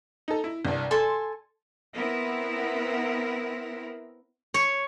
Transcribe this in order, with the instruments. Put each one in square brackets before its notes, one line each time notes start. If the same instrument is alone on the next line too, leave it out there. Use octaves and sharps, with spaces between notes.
[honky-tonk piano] D#4 A4
E4
C2 G2
[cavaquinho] A4 G#5 A5 [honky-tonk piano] C6
[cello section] B3 C4 E4 A#4
[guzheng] C#5